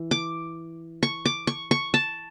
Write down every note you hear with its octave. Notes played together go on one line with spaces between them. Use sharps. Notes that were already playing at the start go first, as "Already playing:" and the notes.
Already playing: E3
D6
C#6
D6
C#6
C#6
A5